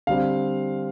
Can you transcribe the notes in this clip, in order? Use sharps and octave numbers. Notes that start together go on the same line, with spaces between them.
D3 G3 C4 F5